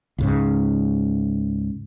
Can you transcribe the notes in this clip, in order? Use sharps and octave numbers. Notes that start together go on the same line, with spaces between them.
C#2 G#2 C#3